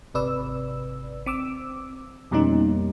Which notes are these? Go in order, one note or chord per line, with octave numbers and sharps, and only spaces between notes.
G#1 C3 B4 D5 E6
C4 D6 E6
F2 B2 G3 A#3 C#4 D#4